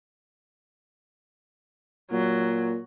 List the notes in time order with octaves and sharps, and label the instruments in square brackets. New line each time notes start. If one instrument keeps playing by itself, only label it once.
[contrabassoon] A#2 [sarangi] F#3